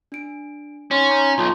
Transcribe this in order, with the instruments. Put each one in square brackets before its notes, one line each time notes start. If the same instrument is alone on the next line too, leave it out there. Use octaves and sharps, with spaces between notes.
[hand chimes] D4 D7
[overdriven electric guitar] C#4 [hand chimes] D#4 C#5 C6
[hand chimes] A#5 D6 G6
[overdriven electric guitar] B1 [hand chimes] F4 A5 C6